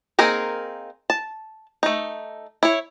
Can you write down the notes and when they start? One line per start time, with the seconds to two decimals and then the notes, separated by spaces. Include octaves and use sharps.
0.19 A#3 C4 D#4 G#4 A#4
1.10 A5
1.83 A3 D#4
2.63 E4 C#5